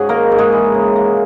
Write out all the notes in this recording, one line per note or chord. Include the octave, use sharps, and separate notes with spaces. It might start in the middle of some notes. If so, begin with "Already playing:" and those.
Already playing: G#2 C#3 F#4 G#4
G#3 A#3 A#4
G#2
G#3 G#4
E3
C#3
A#3